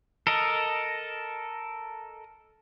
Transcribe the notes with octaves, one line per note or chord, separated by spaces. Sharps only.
A4 A#4 D#5